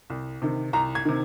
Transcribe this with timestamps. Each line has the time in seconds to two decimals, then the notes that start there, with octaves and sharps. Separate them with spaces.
0.10 C2
0.42 C3 D#3
0.73 C2 A#5
0.95 G#6
1.05 C3 D#3